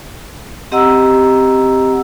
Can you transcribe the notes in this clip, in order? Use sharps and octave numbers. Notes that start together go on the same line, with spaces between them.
C4 G4 D#5 F#5 A#5 E6